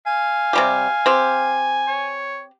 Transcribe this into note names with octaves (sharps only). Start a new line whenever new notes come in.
F5 G#5
C3 G3 G4
C4 G4
C#5